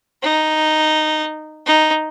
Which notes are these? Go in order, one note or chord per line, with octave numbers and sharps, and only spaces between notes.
D#4
D#4